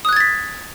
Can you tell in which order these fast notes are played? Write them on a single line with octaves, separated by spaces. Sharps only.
D#6 F#6 G#6 A6 B6